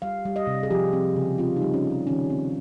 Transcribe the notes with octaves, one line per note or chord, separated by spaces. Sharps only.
G3 F5
G3
D#5
C3
G#4
F3 G4
C4
C#3
C4 F4
D#4
G3
C#4
C4
C#4
D#3 C#4
C4